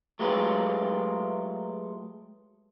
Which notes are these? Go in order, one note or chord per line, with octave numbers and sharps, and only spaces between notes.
F#3 G#3 A3 F4 G4 B4